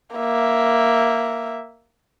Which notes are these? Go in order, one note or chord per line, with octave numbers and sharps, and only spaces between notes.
A#3 E5